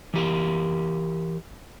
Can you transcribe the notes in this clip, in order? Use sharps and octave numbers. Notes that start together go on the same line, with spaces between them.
E3 G4 A#4